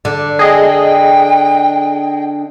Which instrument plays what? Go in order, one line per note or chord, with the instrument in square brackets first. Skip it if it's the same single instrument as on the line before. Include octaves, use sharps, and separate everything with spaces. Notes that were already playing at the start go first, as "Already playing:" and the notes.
[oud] D3 [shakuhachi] D5
[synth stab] G#4 D#5 [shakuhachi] G5